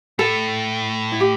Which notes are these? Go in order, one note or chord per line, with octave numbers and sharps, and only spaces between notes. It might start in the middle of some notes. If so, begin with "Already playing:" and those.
A2 A4
E4
G4